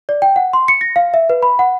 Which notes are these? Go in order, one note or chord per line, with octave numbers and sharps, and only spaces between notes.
D5
G5
F#5
C6
C#7
A#6
F5
E5
B4
B5
F#5